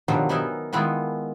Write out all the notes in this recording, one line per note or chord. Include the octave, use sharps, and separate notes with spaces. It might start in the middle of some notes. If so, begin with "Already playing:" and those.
G2 B2 D#3 F3 F#3
B3 D#4 A#4 E5 G#5
D#3 G#3 B3 E4 F4